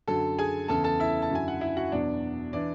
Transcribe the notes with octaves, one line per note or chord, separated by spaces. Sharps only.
F#2 D3 F#3 A4 A5
G#4 G#5
E2 C#3 E3 A4 A5
A4 A5
E4 E5
A5
F#2 D3 F#3 G#5
F#5
E4 E5
F#4 F#5
E2 B2 F#3 D4 D5
E3 D4 D5